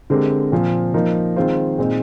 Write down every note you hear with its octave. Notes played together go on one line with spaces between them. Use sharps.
D3 G#3 C4 G4 A#4
A#2 F3 C4
F3 A#3 D#4 A#4
D#3 G#3 C4 F4 C5
A#2 G#3 C4 D#4